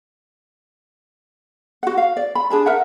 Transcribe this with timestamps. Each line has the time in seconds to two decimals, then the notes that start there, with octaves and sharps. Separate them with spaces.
1.83 F#4 F#5
1.97 F5
2.17 D5
2.35 B5
2.50 D4 G#4 A5 B5
2.66 A#4 E5 F#5